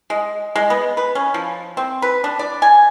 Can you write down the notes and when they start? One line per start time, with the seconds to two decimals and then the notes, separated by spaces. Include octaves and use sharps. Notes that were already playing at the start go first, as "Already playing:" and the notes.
0.10 G#3
0.56 G#3
0.70 B3
0.97 B4
1.15 C#4
1.34 F3
1.77 C4
2.02 B4
2.24 D4
2.39 D5
2.62 G#5